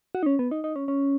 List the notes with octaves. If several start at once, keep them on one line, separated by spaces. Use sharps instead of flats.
F#4
D#4
C#4
B3
D#4
D#4
C#4
C#4